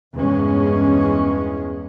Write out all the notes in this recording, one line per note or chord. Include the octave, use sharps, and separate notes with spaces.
E2 G2 G#3 C#4